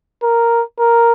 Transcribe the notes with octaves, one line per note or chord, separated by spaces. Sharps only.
A#4
A#4